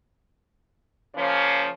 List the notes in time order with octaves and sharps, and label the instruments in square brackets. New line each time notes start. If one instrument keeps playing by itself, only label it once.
[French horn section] C#3 F3 A#3 C#4